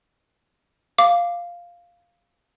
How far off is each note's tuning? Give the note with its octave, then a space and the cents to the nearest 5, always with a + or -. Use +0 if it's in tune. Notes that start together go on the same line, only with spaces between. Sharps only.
F5 +0 D6 +0